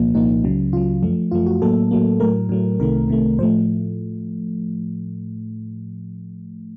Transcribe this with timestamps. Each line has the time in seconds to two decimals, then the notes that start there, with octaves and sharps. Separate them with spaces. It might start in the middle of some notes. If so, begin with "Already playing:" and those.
Already playing: C2 A#2 F3 A#3
0.14 C2 A#2 F3 A#3 D#4
0.44 C#2 C#3 F#3
0.73 C#2 C#3 F#3 F4
1.02 F#2 F3 A3
1.31 F#2 F3 A3 F4
1.46 F#4
1.61 A2 F#3 A#3 A4
1.91 A2 F#3 A#3
2.20 A2 F#3 A3 A#4
2.49 A2 F#3 A3
2.80 C2 C3 D#3 A3 A#4
3.08 C2 C3 D#3 A3
3.39 A2 F3 A3 C5